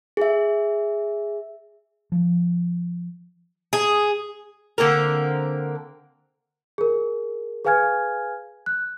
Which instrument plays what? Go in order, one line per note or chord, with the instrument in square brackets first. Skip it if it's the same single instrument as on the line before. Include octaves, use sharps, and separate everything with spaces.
[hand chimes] G#4 E5
[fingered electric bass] F3
[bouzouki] G#4
D3 A#3 C4 A#4
[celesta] G#4 A#4
G#4 B4 F5 G#5 F6 G#6
F#6